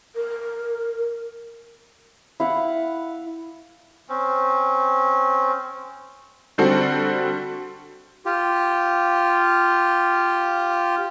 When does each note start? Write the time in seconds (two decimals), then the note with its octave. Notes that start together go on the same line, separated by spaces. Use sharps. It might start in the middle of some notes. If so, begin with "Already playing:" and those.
0.15 A#4
2.40 E4 F5 F#5
4.08 C4 C#4
6.58 D3 G3 C4 F#4 A4
8.26 F4 G4